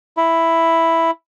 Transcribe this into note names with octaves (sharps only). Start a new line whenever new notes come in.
E4